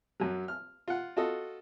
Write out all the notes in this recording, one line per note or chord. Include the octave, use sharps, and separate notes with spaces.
F#2 F#3
F6
F4 F#5
F4 F#4 A4 D#5